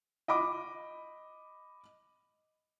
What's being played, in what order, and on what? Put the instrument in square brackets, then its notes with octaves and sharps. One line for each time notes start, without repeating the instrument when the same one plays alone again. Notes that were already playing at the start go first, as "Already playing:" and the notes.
[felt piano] D#5 B5 D6